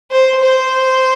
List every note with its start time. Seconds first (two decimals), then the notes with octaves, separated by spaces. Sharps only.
0.11 C5
0.43 C5